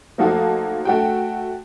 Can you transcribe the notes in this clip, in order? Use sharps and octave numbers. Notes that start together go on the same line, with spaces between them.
F3 A3 A#3 D#4 F#4 A4
A3 F#4 G5